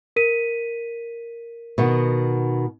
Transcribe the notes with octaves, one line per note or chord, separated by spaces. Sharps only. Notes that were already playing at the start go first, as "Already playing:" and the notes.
A#4 B6 D#7
B2 D#3 B3